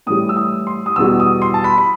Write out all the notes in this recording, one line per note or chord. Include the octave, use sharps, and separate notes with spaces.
A2 E3 G3 D#6
E6
D#6
C6
D#6
E2 B2 G3 E6
D#6
C6
A5
B5
B5